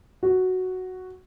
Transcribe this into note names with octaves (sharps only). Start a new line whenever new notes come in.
F#4